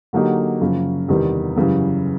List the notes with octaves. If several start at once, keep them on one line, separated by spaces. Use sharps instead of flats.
D3 F#3 A#3 D#4 G4
F#2 C#3 F3
E2 C3 D#3 G3 B3
F#2 C#3 E3 G3